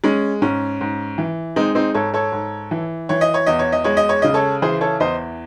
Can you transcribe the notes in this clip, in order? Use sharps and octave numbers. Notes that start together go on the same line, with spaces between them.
G#3 C#4
G#2 C#4
G#2
E3
G#3 C4 D#4
C4 D#4
G#2 A4 C#5
A4 C#5
G#2
E3
E3 C#5
D#5
C#5
E2 D#5
C#5
D#5
G#3 C#5
D#5
C#5
C#3 D#5
A4 C#5
E3 G#4 C5
A4 C#5
E2 C5 D#5